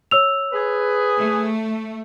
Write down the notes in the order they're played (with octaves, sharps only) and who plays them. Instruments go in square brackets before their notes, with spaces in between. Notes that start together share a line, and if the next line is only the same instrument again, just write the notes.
[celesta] C#5 E6 F7
[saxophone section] G#4 B4
[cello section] A3